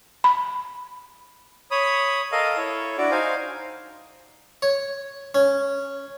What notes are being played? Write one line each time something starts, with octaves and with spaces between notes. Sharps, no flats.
B5
C#5 B5 D#6
A4 A#4 D#5 F5
E4 A4 C#5
D4 E4 F#4 D5
D#4 C5 F5 G#5
C#5
C#4